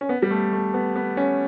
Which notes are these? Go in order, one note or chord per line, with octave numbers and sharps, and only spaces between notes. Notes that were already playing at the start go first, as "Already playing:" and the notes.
C#4
B3
G3
A3
A3
B3
B3
C#4